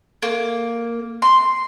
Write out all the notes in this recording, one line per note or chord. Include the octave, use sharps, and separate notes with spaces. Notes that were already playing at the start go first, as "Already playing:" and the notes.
A#3
C6